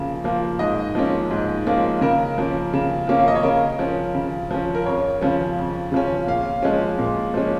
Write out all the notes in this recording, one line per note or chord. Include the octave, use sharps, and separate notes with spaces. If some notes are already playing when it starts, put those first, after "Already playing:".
Already playing: C#3 F3 A#3
F3 A#3
G#2 D#5
F3 A#3 C#4
G#2
F3 A#3 C#4
C#3 A#4
F3 A#3 C#4
C#3
F3 A#3 C#4
F5
D#5
C#5
C#3 A#4
F3 C#4
C#3
F3 C#4
A#4
F2 C#5
C#3 F3 C#4
F2
C#3 F3 C#4
A#2 F5
F3 G#3 C#4
A#2
F3 G#3 C#4